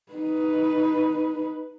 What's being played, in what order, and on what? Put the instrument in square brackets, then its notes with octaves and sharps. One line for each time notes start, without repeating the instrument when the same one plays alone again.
[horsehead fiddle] D#4 B4